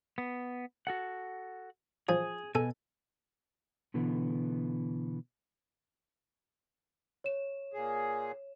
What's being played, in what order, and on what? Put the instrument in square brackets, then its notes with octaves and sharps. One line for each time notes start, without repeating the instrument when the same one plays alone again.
[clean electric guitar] B3
F#4 A4 F#5
[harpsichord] F3 [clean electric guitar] G#4
[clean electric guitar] B2 G#5 [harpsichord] A4
[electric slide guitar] B2 D3 E3 B3
[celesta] C#5 E7
[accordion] A#2 G#4